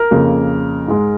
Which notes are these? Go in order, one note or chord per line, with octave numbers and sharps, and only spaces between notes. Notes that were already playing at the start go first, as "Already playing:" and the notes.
Already playing: A#4
F2 C#3 A#3
G#2 G#3